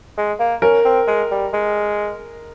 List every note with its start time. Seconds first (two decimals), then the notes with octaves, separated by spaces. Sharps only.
0.17 G#3
0.40 A#3
0.62 C#4 A#4
0.85 C4
1.07 G#3
1.31 G3
1.53 G#3